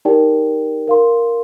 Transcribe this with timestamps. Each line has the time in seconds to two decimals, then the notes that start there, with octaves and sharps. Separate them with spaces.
0.05 D#4 G4 A#4 D5 G5
0.88 A#4 F5 C6